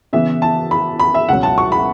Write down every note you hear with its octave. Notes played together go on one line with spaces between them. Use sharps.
C#3 E3 B3 E5
A5
B5
B5
E5
C#2 B2 F#3 F#5
A5
C#6
B5